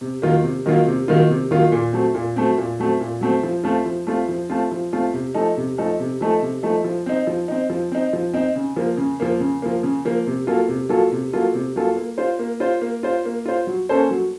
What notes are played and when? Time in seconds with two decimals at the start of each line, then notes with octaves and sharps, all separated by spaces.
0.01 C3
0.22 D#3 F#3 A#3 F4
0.43 C3
0.66 D#3 F#3 A#3 F4
0.87 C3
1.08 D#3 F#3 A#3 F4
1.30 C3
1.51 D#3 F#3 A#3 F4
1.72 A#2
1.93 F#3 A3 C4
2.14 A#2
2.36 F#3 A3 C4
2.58 A#2
2.79 F#3 A3 C4
3.01 A#2
3.21 F#3 A3 C4
3.43 F3
3.64 A3 C4 F4
3.86 F3
4.07 A3 C4 F4
4.29 F3
4.50 A3 C4 F4
4.72 F3
4.93 A3 C4 F4
5.14 C3
5.35 F3 A3 D#4 A4
5.57 C3
5.78 F3 A3 D#4 A4
6.00 C3
6.21 F3 A3 D#4 A4
6.42 C3
6.63 F3 A3 D#4 A4
6.84 F3
7.06 C4 D#4
7.27 F3
7.48 C4 D#4
7.70 F3
7.92 C4 D#4
8.13 F3
8.34 C4 D#4
8.56 C#3
8.76 F3 A#3
8.97 C#3
9.20 F3 A#3
9.40 C#3
9.62 F3 A#3
9.83 C#3
10.05 F3 A#3
10.27 C3
10.47 F#3 A#3 F4 A4
10.69 C3
10.89 F#3 A#3 F4 A4
11.12 C3
11.33 F#3 A#3 F4 A4
11.54 C3
11.76 F#3 A#3 F4 A4
11.96 A#3
12.18 F4 C5
12.39 A#3
12.60 F4 C5
12.81 A#3
13.03 F4 C5
13.25 A#3
13.46 F4 C5
13.67 F#3
13.89 A#3 C#4 A4 C5
14.11 F#3